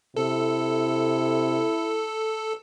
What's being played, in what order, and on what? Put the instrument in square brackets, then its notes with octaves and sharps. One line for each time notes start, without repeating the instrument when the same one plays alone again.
[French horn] C3 [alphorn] E4 [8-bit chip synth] A4